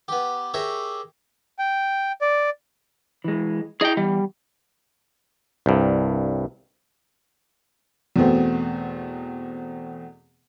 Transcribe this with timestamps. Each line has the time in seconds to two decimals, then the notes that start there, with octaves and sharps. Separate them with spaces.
0.08 B3 G4
0.54 G4 G#4 A#4 C#5 E5
1.59 G5
2.21 D5
3.24 E3 G#3
3.81 E4 G#4 D#5 G5
3.97 E2 G3
5.66 C2 G2
8.16 E2 B2 A3 B3 C4